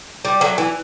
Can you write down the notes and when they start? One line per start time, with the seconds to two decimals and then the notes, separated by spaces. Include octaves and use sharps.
0.25 G3
0.41 F#3 A3
0.58 E3